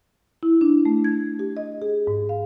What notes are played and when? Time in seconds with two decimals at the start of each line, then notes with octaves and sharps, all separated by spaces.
0.43 E4
0.61 D4
0.85 A3
1.04 G#6
1.39 G4
1.57 D#5
1.82 G#4
2.07 G#2
2.29 F5